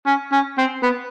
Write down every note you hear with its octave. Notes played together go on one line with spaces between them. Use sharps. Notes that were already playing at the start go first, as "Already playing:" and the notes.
C#4
C#4
C4
B3